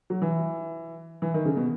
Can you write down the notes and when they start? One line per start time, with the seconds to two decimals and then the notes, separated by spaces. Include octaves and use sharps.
0.10 F#3
0.22 E3
1.22 E3
1.34 D#3
1.45 C#3
1.57 B2